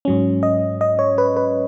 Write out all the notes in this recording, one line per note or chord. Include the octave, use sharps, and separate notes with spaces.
G#2 F#3 C#4
D#5
D#5
C#5
B4
B4